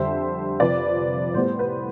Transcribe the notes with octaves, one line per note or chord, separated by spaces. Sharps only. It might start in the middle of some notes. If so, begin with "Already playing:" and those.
Already playing: F2 D3 G3 C5 E5
C3 F3 C4 B4 D5
A2 G3 B3 C5
B4